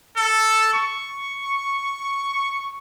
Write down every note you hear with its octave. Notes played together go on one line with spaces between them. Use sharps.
A4
C#6